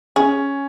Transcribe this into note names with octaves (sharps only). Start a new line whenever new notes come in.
C#4 G#4